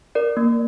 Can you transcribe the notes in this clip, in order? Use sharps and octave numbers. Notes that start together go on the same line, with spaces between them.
A#4 D5
A#3